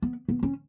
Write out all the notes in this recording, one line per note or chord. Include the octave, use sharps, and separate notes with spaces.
B3
B3
C#4